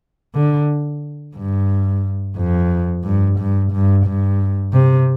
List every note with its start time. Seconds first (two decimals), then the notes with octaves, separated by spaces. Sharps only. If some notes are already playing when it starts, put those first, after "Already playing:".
0.35 D3
1.36 G2
2.37 F2
3.04 G2
3.39 G2
3.72 G2
4.06 G2
4.73 C3